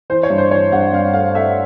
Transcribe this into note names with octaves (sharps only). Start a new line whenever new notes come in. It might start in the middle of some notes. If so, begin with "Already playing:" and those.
E3 C5
C#5
G2
C5
E3 C#5
G2 F#5
G2 F5
A3 F5
A3 E5